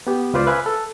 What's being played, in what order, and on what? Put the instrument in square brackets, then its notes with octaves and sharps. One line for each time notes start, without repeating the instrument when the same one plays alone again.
[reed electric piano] B3 G4
C#2 F4 B4 C5 D5 D6
A#4 B4 E5 F5 G#5
A4